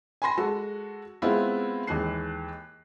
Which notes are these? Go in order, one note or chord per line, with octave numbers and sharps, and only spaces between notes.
G#5 B5 C6 A#6
G#3 F#4 A4
G#3 B3 C4 E4 F4
D#2 E3 G#3 F#6 C7